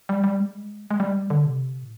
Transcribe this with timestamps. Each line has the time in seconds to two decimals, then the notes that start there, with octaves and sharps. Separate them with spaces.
0.09 G3
0.24 G3
0.39 G#3
0.91 G#3
1.00 G3
1.30 D3
1.45 C3
1.82 A2